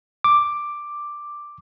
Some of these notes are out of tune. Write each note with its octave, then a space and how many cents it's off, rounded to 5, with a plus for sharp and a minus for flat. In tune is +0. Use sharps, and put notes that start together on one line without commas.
D6 +5